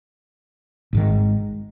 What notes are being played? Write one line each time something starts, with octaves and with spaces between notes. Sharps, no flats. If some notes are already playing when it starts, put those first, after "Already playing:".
G#1 G#2 D#3